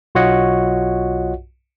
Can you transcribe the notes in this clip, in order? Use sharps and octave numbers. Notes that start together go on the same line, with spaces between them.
B1 F4 F#4 C#5 D#5 F#5